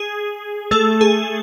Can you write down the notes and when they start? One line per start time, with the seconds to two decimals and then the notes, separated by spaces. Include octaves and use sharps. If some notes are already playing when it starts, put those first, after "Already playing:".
Already playing: G#4
0.71 A3 A4
1.01 G#4